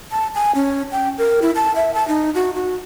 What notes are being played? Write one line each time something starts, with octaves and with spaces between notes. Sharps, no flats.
A5
G#5
C#4
G5
A#4
E4
A5
E5
A5
D#4
F#4
F#4